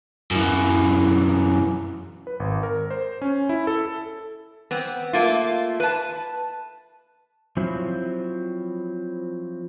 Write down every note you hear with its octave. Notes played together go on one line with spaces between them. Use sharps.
F#2 E3
B4
G#1
A#4
C5
C#4
E4
A4
B3 C4
A3 A#3 F4
B4 A5
F3 F#3 C4 E4